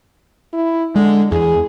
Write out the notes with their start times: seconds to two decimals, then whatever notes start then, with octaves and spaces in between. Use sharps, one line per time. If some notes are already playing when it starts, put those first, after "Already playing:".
0.53 E4
0.95 D3 G#3
1.32 E2 G#4